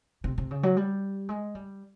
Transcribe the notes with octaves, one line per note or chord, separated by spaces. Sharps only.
C3
C3
C#3
F#3
G3
G#3
G3